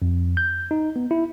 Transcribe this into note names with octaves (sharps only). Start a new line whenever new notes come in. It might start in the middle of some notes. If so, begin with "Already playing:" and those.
F2
G6
D#4
B3
E4